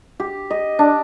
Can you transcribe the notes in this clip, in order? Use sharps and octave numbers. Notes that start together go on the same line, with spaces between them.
G4
D#5
D4